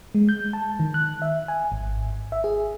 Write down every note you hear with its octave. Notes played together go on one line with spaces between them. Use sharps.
G#3
G6
A5
D#3
F#6
E5
G#5
G#1
E5
G#4